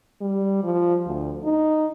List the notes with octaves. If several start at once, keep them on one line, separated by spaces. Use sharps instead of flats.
G3
F3
D2
D#4